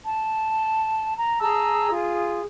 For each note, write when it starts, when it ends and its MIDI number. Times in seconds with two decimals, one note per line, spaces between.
0.04 1.13 81
1.16 1.38 82
1.40 1.90 68
1.40 1.90 81
1.40 1.90 82
1.40 1.90 88
1.91 2.41 65
1.91 2.41 68